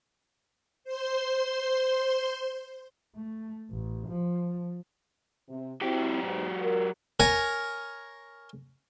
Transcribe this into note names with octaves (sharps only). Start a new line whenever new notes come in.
C5 C6
A3
A1
F3
C3
F#3 C4 E4 G4
G#2 B3
A#4
A#4 C#5 G#5